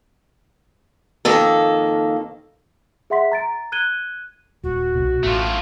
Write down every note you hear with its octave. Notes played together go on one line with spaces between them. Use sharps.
F2 D#3 A#3 A4
G#4 E5 F#5 C6 B6
A#5 A6 D7
F#6 G#6 D#7 G7
D#1 F#4
C2 B2
A1 A2 A3 F4